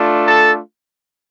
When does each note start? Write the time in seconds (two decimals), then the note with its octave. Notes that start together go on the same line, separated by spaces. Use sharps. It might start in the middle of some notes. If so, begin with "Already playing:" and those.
Already playing: A3 D4 F4
0.27 A4 A5